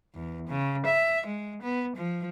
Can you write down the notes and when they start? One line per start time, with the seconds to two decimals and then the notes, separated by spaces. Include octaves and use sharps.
0.15 E2
0.47 C#3
0.86 E5
1.26 G#3
1.62 B3
1.97 F3